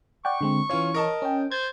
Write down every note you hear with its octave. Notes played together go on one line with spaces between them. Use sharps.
D5 F#5 G5 C#6
D3 G#3 C4
E3 C#4 F4 C#5
A#4 D#5 A5
C#4 G5
C5 G#6 A6